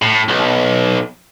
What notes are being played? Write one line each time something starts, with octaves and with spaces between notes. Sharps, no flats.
A2
B1